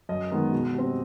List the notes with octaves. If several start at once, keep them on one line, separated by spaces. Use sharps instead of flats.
F#2 D#5
D#3 G#3 B3
B2
G3 C4